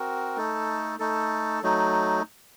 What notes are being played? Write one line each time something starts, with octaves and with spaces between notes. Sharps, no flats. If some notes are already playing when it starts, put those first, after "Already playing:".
Already playing: C4 F#4 A#4
A3 D#4 A4
A3 D#4 A4
F#3 A3 D#4